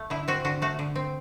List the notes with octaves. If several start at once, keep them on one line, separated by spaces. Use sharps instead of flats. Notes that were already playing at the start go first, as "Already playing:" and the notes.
Already playing: A3
D3 E4
C4 F#4
D3 F#4
A3 F#4
D3
C4